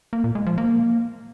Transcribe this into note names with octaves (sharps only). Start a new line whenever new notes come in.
A#3
A#2
G#3
F3
A#3